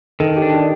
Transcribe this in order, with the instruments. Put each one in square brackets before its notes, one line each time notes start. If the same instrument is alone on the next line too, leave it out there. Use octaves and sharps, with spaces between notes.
[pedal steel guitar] D#3 [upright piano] A4
[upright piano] G4
[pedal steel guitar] D4
[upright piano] G4